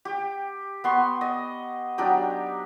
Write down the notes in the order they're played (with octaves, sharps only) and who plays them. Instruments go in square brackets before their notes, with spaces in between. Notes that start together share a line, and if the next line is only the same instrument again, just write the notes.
[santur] G4
B3 C6 C#6
D#5
F#3 D4 D#4 G4